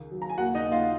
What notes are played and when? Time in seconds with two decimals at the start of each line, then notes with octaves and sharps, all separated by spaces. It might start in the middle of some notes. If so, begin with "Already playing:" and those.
Already playing: C#2 D#3
0.11 F#3
0.22 A#5
0.30 G#5
0.38 D#2 F#4 F#5
0.55 D#4 D#5
0.64 D#2
0.72 F4 F5